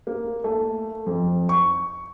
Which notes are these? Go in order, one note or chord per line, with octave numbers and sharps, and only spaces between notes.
A#3
A3
F2
C#6